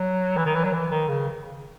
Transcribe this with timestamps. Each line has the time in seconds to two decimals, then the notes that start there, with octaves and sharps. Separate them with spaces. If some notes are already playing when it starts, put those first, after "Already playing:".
Already playing: F#3
0.37 E3
0.45 D#3
0.55 E3
0.64 F#3
0.73 E3
0.91 D#3
1.08 C#3